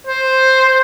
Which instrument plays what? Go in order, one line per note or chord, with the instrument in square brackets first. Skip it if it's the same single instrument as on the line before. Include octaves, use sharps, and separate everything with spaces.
[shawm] C5